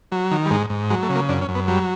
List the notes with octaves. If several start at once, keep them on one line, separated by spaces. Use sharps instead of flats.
F#3
D#3
G3
G#2 G#3
G#2
F#3 G#3
A3
C#3
A#3
F#2 D4
C#4
F#2
B3
F#3 G3